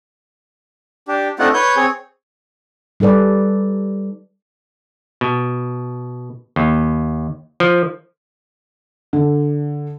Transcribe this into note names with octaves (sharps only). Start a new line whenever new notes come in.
D4 G4
A3 C4 D4 D#4 F4 F#5
B4 C#5 G6
C4 G#4 C#5
G3 D#4 A4 B4 D5
B2
D#2
F3
D3